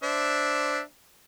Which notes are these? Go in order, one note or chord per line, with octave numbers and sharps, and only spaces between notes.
D4 C5 E5